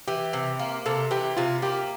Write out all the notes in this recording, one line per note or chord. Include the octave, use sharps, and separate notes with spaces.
E3 G4
C3
A#3
C3 A4
E3 G4
C3 F4
A#3 G4